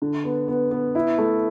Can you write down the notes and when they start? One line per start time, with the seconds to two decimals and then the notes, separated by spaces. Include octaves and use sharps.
0.02 D3
0.24 B3
0.48 B3
0.71 B3
0.95 E4
1.18 A3